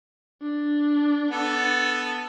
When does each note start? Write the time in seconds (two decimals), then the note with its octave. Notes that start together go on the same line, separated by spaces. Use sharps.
0.42 D4
1.31 B3 A4